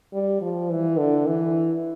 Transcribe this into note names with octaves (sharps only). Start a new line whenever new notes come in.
G3
F3
E3
D3
E3